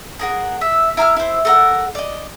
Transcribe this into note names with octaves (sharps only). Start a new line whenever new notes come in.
G#4 A#4 F#5
E5
E4 A#5 E6 F6
E4 C5
A4 A#4 F#5
D5 D#5